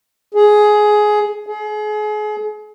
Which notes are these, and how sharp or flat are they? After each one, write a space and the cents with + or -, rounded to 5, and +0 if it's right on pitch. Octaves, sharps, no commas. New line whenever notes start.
G#4 +15
G#4 +35